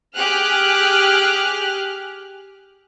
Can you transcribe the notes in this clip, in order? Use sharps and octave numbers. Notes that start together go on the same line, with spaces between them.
G4 G#4 F6 F#6